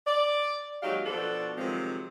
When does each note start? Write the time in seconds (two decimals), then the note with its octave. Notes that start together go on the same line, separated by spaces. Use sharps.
0.06 D5
0.83 D#2 F#3 G#3 D#4 G4 F5
1.06 B2 F3 D4 F#4 A4
1.58 C3 D#3 F3 F#3 G#3 C4